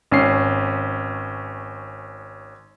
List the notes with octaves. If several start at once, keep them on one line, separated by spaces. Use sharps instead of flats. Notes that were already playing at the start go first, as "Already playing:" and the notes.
G#1 C#4 C7